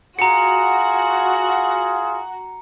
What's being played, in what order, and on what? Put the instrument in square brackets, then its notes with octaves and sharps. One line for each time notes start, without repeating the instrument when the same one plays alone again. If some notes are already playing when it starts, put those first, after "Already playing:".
[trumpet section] F4 G#4 [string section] F#4 [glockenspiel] A#5 C#7